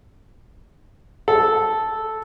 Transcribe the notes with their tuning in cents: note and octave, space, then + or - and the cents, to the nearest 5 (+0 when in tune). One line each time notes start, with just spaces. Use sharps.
A4 -5